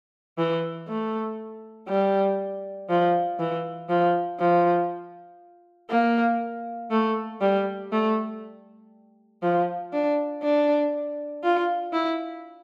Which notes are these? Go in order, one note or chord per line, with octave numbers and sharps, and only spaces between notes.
E3
A3
G3
F3
E3
F3
F3
A#3
A3
G3
A3
F3
D4
D4
F4
E4